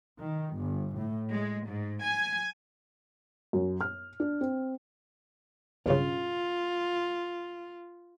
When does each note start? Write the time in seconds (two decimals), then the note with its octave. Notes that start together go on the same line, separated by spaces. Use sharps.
0.20 D#3
0.57 G1
0.98 A2
1.30 G#3
1.68 G#2
2.03 G#5
3.53 F#2
3.81 F6
4.20 D4
4.41 C4
5.86 B1 G2 C#3 F4